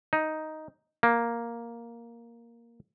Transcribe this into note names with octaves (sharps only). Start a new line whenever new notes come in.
D#4
A#3